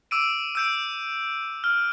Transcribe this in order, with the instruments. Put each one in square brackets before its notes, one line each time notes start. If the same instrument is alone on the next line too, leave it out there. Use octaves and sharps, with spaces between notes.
[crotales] D6 E6 D7 D#7
E6 G6 D7
F6